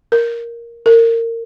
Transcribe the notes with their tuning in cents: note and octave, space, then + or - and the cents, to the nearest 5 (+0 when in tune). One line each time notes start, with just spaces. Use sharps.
A#4 +5
A#4 -25